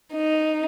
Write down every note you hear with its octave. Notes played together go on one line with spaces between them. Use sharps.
D#4